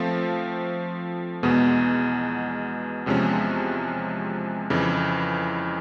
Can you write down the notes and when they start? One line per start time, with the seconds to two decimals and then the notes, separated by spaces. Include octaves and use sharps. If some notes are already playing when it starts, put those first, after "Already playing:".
Already playing: F3 A3 C4 F4
1.43 E2 B2 G#3 B3
3.06 E2 C3 F3 G#3 C#4
4.70 F2 C#3 E3